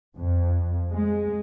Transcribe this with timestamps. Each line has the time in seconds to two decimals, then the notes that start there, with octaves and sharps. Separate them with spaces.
0.17 F2
0.92 G#3